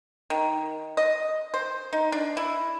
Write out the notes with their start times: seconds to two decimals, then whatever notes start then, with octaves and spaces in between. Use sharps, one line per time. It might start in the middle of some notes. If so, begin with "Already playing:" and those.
0.30 D#3
0.97 D#5
1.54 C5
1.93 D#4
2.12 D4
2.37 E4